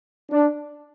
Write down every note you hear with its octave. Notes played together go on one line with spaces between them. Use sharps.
D4